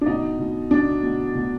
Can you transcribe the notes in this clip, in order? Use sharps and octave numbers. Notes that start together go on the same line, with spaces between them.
D4
B2 D#4
B2
B2 D4
B2
B2